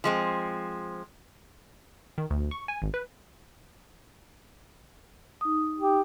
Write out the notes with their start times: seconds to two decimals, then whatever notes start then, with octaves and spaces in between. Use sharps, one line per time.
0.04 F3 G#3 C4
2.18 D#3
2.30 D2
2.51 C#6
2.68 G#5
2.82 G#1
2.94 B4
5.41 D#4 D#6
5.78 G4